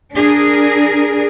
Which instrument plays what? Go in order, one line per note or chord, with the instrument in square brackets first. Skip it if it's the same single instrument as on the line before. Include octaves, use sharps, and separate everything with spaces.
[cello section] D4 G#4 A#4